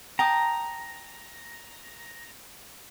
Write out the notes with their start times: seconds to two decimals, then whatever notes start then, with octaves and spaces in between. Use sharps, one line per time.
0.19 G5 A5 A#5 D#6